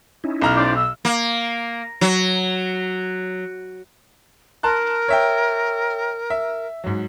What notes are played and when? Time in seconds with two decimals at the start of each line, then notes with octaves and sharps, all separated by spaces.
0.24 C#4 D#4 E4
0.42 B1 A#5 F6
0.56 C5 D5
0.77 E6
1.05 A#3
2.01 F#3
4.63 A#4 A5 C6 F#6
5.08 C#5 E5 G5
6.30 E5
6.84 G#2 F#3